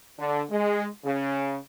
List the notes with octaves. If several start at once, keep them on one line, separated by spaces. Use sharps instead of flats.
D3
G#3
C#3